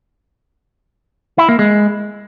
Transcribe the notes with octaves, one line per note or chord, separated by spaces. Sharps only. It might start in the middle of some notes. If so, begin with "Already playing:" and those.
E4
A#3
G#3